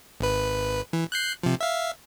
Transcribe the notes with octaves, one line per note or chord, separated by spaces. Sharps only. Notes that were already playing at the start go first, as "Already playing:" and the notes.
G#1 B4
E3
F#6 G6 C7
C3 F3
E5 F5